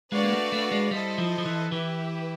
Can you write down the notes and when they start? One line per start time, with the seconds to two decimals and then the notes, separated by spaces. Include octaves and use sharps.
0.12 G#3 D4 F#4 B4 D5 F5
0.23 A#3
0.33 A3
0.52 A3
0.72 G#3
0.91 G3 E4 A4 C5 D#5
1.18 F3
1.38 F3
1.45 E3
1.72 E3 E4 G4 B4 E5